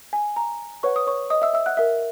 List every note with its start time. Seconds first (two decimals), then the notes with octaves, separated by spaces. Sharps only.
0.13 G#5
0.36 A#5
0.83 B4 C#5 F#5 C#6
0.96 D#6
1.07 C#5 C#6
1.30 D#5 D#6
1.42 E5 E6
1.54 E5 E6
1.66 F#5 F#6
1.77 A#4 E5